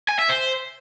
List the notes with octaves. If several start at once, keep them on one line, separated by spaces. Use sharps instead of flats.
G#5
E5
C5